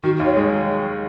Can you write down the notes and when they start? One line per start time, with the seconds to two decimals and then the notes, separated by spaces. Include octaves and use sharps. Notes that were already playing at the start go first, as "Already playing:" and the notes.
0.04 D#3 F#4
0.20 D#2
0.26 C#5
0.37 G#3